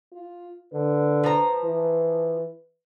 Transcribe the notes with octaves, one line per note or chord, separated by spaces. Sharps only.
F4
D3 B4
F3 A#5
E3